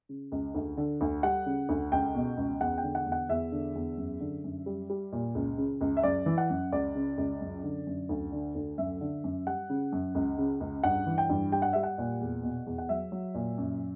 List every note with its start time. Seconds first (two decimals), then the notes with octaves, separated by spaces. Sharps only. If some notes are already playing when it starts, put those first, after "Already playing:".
0.09 C#3
0.32 C#2
0.55 D2
0.77 D3
1.01 D2
1.23 G3 F#5
1.46 C#3
1.69 D2
1.92 C#2 G5
2.15 B2
2.37 C#2
2.60 E2 F#5
2.78 G5
2.83 D3
2.95 F#5
3.06 E2
3.12 F#5
3.29 E2 E5
3.52 D3
3.75 E2
3.97 F#2
4.20 D3
4.44 F#2
4.66 G3
4.90 G3
5.12 A#2
5.35 C#2
5.58 C#3
5.81 C#2
5.97 E5
6.03 F#2 D5
6.26 E3
6.38 F#5
6.50 F#2
6.72 C#2 D5
6.95 C#3
7.18 C#2
7.41 F#2
7.63 D3
7.86 F#2
8.09 D2
8.32 D3
8.55 D2
8.78 F#2 E5
9.01 D3
9.24 F#2
9.47 G3 F#5
9.70 C#3
9.92 F#2
10.15 C#2
10.38 C#3
10.60 C#2
10.83 G2 F#5
11.07 E3
11.18 G5
11.29 G2
11.52 G3 G5
11.62 F#5
11.73 G3 E5
11.83 F#5
11.98 A#2
12.21 E2
12.43 B2
12.66 E2
12.78 F#5
12.89 F#3 E5
13.12 F#3
13.35 A#2
13.58 F#2